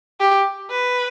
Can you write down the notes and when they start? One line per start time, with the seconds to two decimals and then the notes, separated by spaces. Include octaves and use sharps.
0.20 G4
0.70 B4